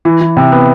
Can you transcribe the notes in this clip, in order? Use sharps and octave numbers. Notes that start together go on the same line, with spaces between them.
E3
E3
C3
B3